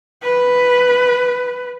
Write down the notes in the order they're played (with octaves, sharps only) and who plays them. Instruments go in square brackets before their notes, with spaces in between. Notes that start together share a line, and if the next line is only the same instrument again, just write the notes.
[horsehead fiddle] B4